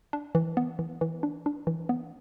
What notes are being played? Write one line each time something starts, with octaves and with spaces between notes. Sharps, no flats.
D4
E3
B3
E3
E3
D4
D4
E3
B3